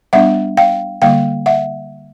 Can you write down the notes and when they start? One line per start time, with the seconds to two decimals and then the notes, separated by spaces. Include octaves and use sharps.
0.13 G3 B3 D4 E5 F#5
0.57 F5 G5
1.02 D3 G3 A#3 F5 G5
1.46 E5 F#5